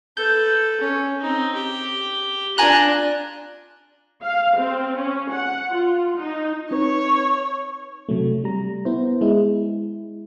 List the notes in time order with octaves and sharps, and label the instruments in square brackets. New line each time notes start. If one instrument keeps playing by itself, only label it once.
[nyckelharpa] A4 B4 [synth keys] G6
[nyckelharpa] C#4
C4 D#4
G4
[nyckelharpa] D4 F4 [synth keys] G#5 A#5 F#6
[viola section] F5
C4
C#4
F#5
F4
D#4
[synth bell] C4 D#4 B4 [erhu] C#5
[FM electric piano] C3 F#3 A3
G3 A#5
B3 E4 C5
G#3 E4